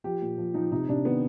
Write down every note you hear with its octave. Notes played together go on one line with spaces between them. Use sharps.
F3 G4
A#2
F3
F3 D#4
C3 D#4
C3 D4
D#3 B3